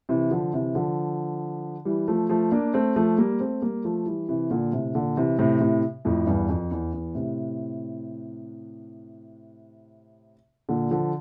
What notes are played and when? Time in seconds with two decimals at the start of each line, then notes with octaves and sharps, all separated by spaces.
0.09 C3 E3
0.31 D3 F3
0.53 C3 E3
0.75 D3 F3
1.85 E3 G3
2.08 F3 A3
2.29 F3 A3
2.52 A#3 D4
2.74 A3 C4
2.96 F3 A3
3.18 G3 A#3
3.40 A3 C4
3.62 G3 A#3
3.84 F3 A3
4.06 E3 G3
4.29 C3 E3
4.51 A#2 D3
4.72 A2 C3
4.94 A#2 D3
5.17 C3 E3
5.39 A2 C3
5.60 A2 C3
6.05 F2 A2
6.27 E2 G2
6.49 F2
6.71 E2
6.93 E2
7.15 A2 C3
10.69 A#2 D3
10.91 D3 F3